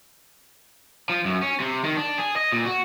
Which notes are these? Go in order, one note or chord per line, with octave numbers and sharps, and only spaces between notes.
F3
F#2
C#4
C3
D#3
D4
G#4
D#5
A#2
F#4